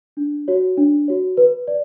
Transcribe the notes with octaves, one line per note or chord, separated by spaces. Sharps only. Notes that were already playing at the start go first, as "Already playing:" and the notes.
D4
F#4 C#5
D4
F#4 C#5
B4
D5